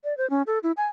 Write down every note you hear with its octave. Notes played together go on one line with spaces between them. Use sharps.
D5
C5
C#4
A4
E4
G#5